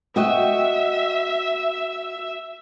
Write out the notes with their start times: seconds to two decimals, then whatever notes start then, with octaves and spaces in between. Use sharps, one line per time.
0.16 F#4 D#5 E5 G5